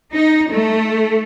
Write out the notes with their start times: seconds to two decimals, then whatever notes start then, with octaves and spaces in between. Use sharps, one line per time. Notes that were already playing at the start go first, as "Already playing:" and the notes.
0.13 D#4
0.51 A3